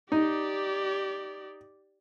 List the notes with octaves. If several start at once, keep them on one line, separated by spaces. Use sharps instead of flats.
D#4 G4 D5